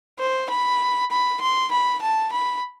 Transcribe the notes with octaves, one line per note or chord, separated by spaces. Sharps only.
C5
B5
B5
C6
B5
A5
B5